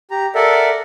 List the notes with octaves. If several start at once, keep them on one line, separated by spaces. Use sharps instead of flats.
G4 A#5
A4 A#4 D5 E5 F#5